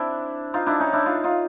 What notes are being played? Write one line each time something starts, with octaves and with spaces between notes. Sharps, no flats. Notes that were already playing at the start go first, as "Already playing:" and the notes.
Already playing: C4 D4 E4
D#4 F4
D4 E4
C#4 D#4
D4 E4
D#4 F4
D#4 F4